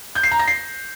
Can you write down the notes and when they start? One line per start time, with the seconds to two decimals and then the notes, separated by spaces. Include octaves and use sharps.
0.15 G6
0.23 C7
0.31 A#5
0.39 A#6
0.47 C7